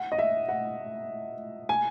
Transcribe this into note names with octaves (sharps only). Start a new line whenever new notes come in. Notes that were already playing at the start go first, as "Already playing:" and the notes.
Already playing: F#5
D#5
E5
F#5
G#5